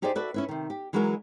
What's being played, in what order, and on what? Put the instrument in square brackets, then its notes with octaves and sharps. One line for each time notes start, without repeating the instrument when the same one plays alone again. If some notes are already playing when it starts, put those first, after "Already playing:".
[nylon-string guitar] D#4 G4 G#4 C5 D5 D#5
F#4 A4 B4 D5 E5
C#4 E4 B4
C3 D#3
G4
E3 F#3 G#3 F#4 A4 A#4